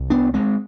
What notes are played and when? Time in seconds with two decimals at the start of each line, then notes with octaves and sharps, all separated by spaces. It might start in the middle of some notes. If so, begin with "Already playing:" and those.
Already playing: C2
0.10 B3 D4
0.34 G#3 C4